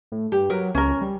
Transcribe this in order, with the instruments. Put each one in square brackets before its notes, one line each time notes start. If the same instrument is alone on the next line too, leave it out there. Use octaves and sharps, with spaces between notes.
[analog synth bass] A2
[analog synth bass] G2 [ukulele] G4
[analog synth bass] F#3 [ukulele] A#4 B4
[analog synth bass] C#2 [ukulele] C#4 A#4
[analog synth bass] G3